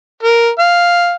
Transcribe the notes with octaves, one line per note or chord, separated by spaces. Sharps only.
A#4
F5